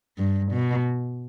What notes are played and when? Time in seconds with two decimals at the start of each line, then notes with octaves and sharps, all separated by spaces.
0.18 G2
0.52 B2